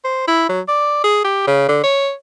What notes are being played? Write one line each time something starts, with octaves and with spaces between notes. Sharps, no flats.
C5
E4
F#3
D5
G#4
G4
C#3
D3
C#5